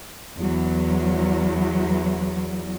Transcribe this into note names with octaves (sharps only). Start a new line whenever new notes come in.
E2 F#3